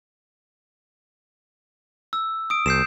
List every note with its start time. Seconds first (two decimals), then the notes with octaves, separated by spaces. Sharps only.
2.13 E6
2.50 D#6 D7
2.66 C2 G6 C7 E7